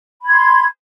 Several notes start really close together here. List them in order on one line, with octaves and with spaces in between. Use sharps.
B5 G#6 C6